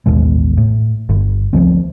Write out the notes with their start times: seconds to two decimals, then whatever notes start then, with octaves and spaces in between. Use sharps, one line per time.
0.06 A1 D#2 B2 G#3
0.58 A2
1.09 G1
1.53 D2 F3 F#3 C4